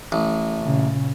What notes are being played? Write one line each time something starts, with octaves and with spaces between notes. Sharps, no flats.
A1
A#2 C#3